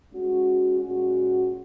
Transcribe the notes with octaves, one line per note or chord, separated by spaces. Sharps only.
G#3 C#4 F#4
A#2 G#3 C#4 F#4